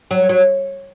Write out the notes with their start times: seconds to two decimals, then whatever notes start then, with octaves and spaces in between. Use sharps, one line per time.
0.11 F#3
0.29 F#3